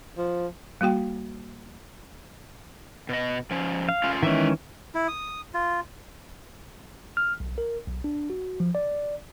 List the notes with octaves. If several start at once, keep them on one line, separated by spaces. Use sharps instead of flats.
F3
G3 A#3 F#4 G5
B2 D#5
F3 C#4
F5
A3 C#4 F4
D#3 E3 G#3 C#4 E5
E4
D#6
F4
F6
B1
A#4
B1
D4
F#4
F3
D5